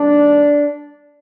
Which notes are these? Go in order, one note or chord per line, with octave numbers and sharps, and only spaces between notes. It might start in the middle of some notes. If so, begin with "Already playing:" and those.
Already playing: D#3 G3 A#3 D4